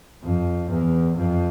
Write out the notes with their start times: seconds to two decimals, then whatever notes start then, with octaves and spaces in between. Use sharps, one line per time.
0.23 F2
0.70 E2
1.17 F2